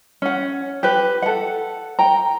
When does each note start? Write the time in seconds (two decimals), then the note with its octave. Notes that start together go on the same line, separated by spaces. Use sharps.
0.22 C#4 F#5
0.83 G4 B4
1.22 A4 F#5
1.99 G5 A#5